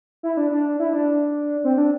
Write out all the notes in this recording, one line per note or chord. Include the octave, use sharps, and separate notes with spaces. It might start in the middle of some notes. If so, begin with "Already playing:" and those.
E4
D4
D4
E4
D4
C4
D4